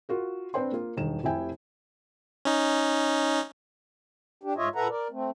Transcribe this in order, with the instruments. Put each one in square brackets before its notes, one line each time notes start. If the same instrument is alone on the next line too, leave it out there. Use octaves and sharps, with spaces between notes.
[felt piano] F4 F#4 A#4
C4 D4 B4 C5 G5 C6
A#3 F4
E1 G2 D#3 E7
F1 C3 E4 G5 G#5
[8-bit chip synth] C#4 D#4
[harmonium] D4 G4
G#2 F4 C#5 D#5 E5
A#2 A4 B4 E5 F#5 A#5
A#4 D5
A3 C4